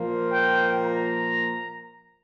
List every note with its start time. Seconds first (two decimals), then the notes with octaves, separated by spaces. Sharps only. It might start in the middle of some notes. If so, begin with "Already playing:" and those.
Already playing: A#2 F3 A#3
0.30 G5
0.87 A#5